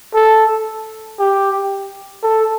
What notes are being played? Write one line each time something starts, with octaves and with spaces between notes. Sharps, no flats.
A4
G4
A4